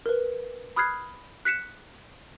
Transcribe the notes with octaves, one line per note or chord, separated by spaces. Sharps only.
A#4 B4
B5 D#6 F6 F#6 G#6 C7
F#6 B6 C#7 E7